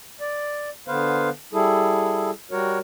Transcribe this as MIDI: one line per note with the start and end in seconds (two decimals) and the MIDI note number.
0.21 0.70 74
0.88 1.29 50
0.88 1.29 59
0.88 1.29 71
0.88 1.29 72
0.88 1.29 77
1.53 2.30 55
1.53 2.30 64
1.53 2.30 68
1.53 2.30 69
2.51 2.79 55
2.51 2.79 66
2.51 2.79 70
2.51 2.79 73